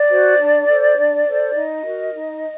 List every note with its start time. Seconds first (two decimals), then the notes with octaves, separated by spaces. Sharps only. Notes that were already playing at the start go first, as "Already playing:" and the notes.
Already playing: D5
0.08 F#4 C5
0.37 D4
0.67 A4 C5
0.96 D4
1.26 A4 C5
1.55 D#4 D#5
1.84 F#4 A#4
2.14 D#4